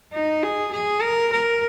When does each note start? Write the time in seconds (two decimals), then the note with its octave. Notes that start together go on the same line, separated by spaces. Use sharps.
0.13 D#4
0.43 G#4
0.72 G#4
1.02 A#4
1.32 A#4